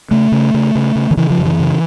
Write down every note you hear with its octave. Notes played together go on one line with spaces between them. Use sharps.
C#3 A3
C#3
C#3
C#3
C#3
D#3
C#3 E3
F3
F#2
E3
C#3